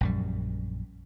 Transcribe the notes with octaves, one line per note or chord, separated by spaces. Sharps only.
A#1 F#2 G3